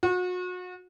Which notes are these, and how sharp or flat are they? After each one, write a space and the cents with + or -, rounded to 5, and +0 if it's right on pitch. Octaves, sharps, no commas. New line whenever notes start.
F#4 -35